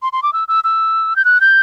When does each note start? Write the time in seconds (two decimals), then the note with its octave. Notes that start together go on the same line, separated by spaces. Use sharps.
0.02 C6
0.13 C6
0.23 D6
0.33 E6
0.48 E6
0.64 E6
1.16 G6
1.25 F#6
1.41 G6